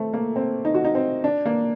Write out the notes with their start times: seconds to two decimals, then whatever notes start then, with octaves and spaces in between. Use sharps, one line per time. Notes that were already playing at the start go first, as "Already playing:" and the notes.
Already playing: A3 C4
0.14 A#3
0.36 C4
0.65 D#4
0.74 F#4
0.85 D#4
0.95 C4
1.24 D4
1.46 A#3